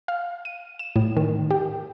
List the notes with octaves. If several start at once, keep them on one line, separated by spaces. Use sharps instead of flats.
F5
D#7
E7
A2
D#3
G4